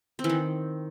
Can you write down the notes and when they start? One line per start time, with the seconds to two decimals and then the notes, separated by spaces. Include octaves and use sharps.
0.19 C4
0.24 E3
0.29 D#3